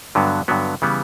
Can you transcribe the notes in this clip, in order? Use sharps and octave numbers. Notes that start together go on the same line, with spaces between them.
G2 D3 F#3 B3
G2 D3 F#3 B3
C#3 E3 G3 B3